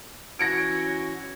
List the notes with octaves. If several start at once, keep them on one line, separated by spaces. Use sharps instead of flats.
E3 C#4 F#4 G#6 A#6 C#7 D7